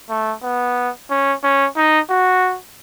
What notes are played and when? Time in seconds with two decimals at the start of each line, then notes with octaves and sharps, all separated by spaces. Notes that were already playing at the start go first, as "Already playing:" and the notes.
0.09 A3
0.43 B3
1.10 C#4
1.43 C#4
1.76 D#4
2.10 F#4